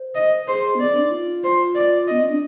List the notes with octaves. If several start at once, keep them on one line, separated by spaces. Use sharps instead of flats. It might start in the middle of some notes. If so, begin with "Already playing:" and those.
Already playing: C5
D#5
G#4 C5
B3
D5
C4
D4
D#4
F4
C5
D5
B3 D#5
C4
D4